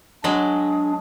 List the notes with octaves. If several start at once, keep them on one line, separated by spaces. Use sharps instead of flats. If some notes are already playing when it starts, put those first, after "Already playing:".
F#3 G#3 D4